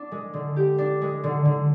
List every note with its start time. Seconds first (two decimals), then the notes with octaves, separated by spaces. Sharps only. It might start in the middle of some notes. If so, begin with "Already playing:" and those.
Already playing: D4
0.12 G#3
0.34 D3
0.56 G4
0.78 D4
1.01 G#3
1.24 D3
1.45 D3